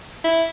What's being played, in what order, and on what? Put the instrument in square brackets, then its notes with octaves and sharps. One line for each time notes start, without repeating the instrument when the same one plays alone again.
[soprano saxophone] E4